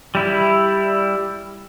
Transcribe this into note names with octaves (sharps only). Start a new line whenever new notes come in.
G3 E4